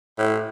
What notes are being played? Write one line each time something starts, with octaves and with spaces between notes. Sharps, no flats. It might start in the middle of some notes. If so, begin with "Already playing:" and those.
A2